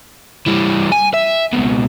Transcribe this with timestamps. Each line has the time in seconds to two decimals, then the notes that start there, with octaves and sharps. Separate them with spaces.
0.47 E3 G3
0.92 G#5
1.14 E5
1.53 C#2 B2